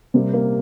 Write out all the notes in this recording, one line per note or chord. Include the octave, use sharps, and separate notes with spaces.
C3 G3 A#3
A#3 A#4